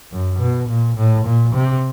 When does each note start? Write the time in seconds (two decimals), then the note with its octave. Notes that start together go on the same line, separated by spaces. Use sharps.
0.12 F#2
0.39 B2
0.69 A#2
0.97 A2
1.25 A#2
1.54 C3